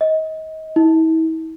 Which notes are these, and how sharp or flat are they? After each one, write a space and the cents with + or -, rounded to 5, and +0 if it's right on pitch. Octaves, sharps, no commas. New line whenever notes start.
D#5 +30
E4 -40